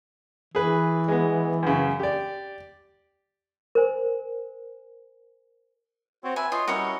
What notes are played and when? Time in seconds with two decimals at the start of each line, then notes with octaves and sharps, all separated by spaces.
0.55 E3 G#4 B4
1.08 G#3 B3
1.63 F#2 C#3
2.00 G4 D5
3.75 A#4 C5 G#5
6.24 C4 F#4 C#5
6.36 B4 E5 G#5
6.52 F4 C#5 D#5 C6 G6
6.68 G3 C#4 E4 F#4 A#4 C#5 D#5